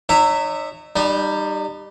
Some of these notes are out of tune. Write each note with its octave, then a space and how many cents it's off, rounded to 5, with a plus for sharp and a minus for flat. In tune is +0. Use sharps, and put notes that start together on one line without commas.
D#4 -30 C#5 +5 E5 +0
G3 +0 D#4 -35